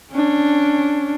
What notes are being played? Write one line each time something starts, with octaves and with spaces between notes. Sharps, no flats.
C#4 D4